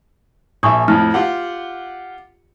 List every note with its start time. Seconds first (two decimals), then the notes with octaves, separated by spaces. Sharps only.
0.63 A#1 E5 G#5 C#6 D#6
0.88 F2 A2 F6
1.14 F4 G4 F#5